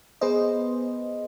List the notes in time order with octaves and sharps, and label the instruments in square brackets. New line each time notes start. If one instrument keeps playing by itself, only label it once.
[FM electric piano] B3 G#4 B4 C5 D#5